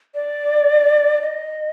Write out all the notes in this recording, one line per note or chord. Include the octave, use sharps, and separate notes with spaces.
D5
D#5